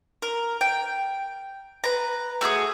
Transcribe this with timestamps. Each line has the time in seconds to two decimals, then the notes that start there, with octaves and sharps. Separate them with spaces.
0.22 A#4
0.61 G5
1.84 B4 A#5
2.41 A3 F#4 G#4 D#6